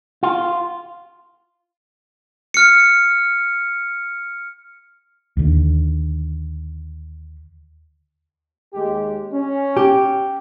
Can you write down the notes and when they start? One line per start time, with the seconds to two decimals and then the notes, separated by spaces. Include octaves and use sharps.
0.23 F4
2.54 F6 C#7
5.37 D#2 D3
8.73 D#2 G#3 G4
9.32 C#4
9.77 G4